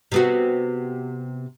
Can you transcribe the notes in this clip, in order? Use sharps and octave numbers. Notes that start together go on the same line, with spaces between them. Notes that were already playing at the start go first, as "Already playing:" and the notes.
C3 B3 F#4